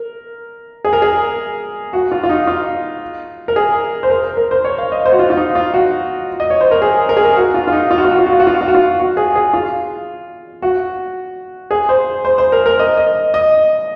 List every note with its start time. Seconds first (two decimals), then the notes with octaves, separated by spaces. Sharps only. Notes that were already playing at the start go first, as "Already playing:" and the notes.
Already playing: A#4
0.85 G#4
0.93 A#4
1.02 G#4
1.93 F#4
2.12 F4
2.23 F4
2.29 D#4
2.47 F4
3.48 A#4
3.56 G#4
4.03 C5
4.10 A#4
4.37 A#4
4.51 C5
4.65 C#5
4.78 F5
4.92 D#5
5.05 C5
5.12 F#4
5.19 F4
5.30 F4
5.37 D#4
5.55 F4
5.74 F#4
6.40 D#5
6.50 C#5
6.61 C5
6.71 A#4
6.82 G#4
7.09 A#4
7.17 G#4
7.25 A#4
7.37 F#4
7.54 F4
7.67 F4
7.72 D#4
7.91 F4
7.98 F#4
8.05 F4
8.11 F#4
8.19 F4
8.26 F#4
8.33 F4
8.40 F#4
8.47 F4
8.54 F#4
8.61 F4
8.68 F#4
8.75 F4
8.99 F#4
9.17 G#4
9.35 G#4
9.53 F4
10.62 F#4
11.71 G#4
11.89 C5
12.25 C5
12.38 C5
12.52 A#4
12.66 A#4
12.79 D#5
12.97 D#5
13.34 D#5